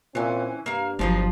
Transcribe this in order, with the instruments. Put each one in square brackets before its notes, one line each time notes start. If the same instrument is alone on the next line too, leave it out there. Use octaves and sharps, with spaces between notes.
[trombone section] A#2 C4 [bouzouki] E3 C#4
[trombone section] G2 [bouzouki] A#3 F5
[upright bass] G1 F#3 [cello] F3 [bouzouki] D4 D#4 C5